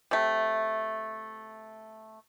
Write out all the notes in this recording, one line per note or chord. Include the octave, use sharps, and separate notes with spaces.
C3 A3